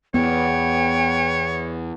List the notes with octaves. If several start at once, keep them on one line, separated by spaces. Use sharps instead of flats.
E2 B3 C#5 G5